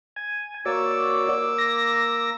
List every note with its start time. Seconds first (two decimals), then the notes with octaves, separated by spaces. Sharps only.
0.16 G#5
0.66 A#3 F#4 C#5 D5 D6 E6
1.58 A#6